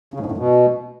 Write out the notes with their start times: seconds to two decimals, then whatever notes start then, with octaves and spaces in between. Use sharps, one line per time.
0.14 C#3
0.20 G#2
0.26 A2
0.32 F#2
0.37 B2